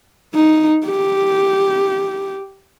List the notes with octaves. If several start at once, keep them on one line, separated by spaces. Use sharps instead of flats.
D#4
G4